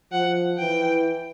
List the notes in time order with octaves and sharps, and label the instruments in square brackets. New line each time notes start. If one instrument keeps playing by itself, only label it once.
[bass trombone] F3 [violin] F#5
[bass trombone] E3 [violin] G5